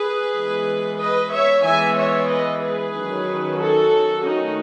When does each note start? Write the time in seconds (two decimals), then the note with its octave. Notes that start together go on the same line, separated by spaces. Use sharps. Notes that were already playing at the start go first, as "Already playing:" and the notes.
Already playing: G#4 B4
0.35 E3 G#3 B3
1.00 B4 D#5
1.33 C#5 E5
1.65 E3 G#3 B3 E5 G#5
1.97 C#5 E5
2.30 B4 D#5
2.62 G#4 B4
2.94 D#3 F#3 C#4
3.59 F#4 A4
4.23 D#3 A3 C#4 D#4 F#4